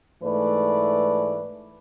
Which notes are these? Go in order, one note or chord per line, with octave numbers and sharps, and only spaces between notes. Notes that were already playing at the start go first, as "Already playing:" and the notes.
G#2 E3 A3 B4 D5